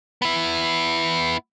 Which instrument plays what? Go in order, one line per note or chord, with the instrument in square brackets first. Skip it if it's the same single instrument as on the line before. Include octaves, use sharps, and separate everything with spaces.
[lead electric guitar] B3 E4